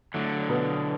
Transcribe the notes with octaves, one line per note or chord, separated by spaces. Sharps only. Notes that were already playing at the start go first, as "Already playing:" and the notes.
D3 F#3 A3
B2